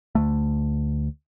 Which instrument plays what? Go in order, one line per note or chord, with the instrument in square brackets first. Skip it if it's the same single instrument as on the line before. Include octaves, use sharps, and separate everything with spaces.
[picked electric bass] D2 A3